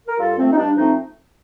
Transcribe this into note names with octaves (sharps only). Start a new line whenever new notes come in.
A#4
G2 F4 A4
F3 A3 C4
D#4
G2 D4
F3 A3 C4 D#4